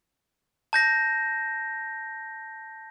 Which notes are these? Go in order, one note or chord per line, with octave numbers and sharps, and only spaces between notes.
A5 G6 A#6